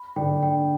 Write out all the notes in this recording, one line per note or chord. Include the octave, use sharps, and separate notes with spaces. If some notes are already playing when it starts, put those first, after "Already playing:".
Already playing: B5
D3 D4 G5
G5